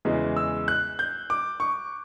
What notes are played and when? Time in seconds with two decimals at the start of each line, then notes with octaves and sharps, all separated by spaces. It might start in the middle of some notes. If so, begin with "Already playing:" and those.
0.05 E2 C#3 E3 G#3
0.37 E6
0.68 F#6
0.99 G6
1.30 D6
1.60 C#6